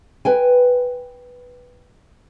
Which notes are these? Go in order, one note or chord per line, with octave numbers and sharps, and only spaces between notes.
B4 G5 G#5